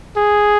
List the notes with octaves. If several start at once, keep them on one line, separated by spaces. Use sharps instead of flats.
G#4